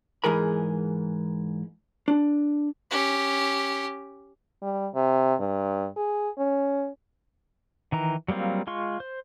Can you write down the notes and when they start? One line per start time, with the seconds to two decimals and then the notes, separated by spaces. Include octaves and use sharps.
0.24 G#2 E3 G#4 A#4 B5
2.08 D4
2.91 C#4 G4
4.62 G3
4.95 C3
5.40 G2
5.97 G#4
6.38 C#4
7.92 D#3 E3 A#5
8.28 F#3 G3 A#3 C4 F4
8.67 G#3 F4 C6 C#6
9.00 C5